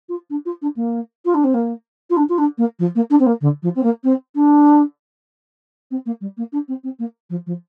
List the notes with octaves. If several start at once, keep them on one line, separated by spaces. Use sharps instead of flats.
F4
D4
F4
D4
A#3
F4
D4
C4
A#3
F4
D4
F4
D4
A#3
F3
A#3
D4
C4
A#3
D3
F3
C4
A#3
C4
D4
C4
A#3
G3
A#3
D4
C4
C4
A#3
F3
F3